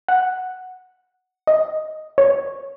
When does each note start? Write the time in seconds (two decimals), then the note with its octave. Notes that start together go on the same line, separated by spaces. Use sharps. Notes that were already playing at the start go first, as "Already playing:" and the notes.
0.08 F#5
1.47 D#5
2.18 C#5